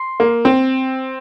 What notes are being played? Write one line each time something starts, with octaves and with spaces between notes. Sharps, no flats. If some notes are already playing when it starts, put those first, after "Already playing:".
Already playing: C6
A#3
C4